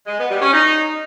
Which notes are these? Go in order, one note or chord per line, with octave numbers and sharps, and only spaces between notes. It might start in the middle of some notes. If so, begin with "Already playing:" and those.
G#3
B3
G3
C#4
D#4